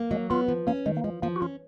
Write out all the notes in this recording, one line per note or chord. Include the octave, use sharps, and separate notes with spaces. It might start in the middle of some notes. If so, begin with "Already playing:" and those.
Already playing: A#3
F#3 G#3
B3 F4
F3
A#3 C#4
D#3 G#3
A#3
F3 G#3
F3 A#3
F#4
C#4 F4